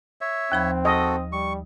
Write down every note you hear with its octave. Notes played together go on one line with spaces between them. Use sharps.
C#5 E5
D#2 F3 C4 B5
F#4 A4 D#5
G3 C#6